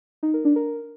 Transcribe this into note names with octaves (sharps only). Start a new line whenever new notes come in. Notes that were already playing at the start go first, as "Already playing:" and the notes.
D#4
A#4
D4
A#4